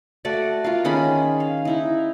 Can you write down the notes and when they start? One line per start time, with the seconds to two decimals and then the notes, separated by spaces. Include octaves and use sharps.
0.25 A3 F#4 D5
0.64 F4 A#4 F5
0.85 D#3 C#4 G#4 B5
1.40 F5
1.65 D#4 E4 A#5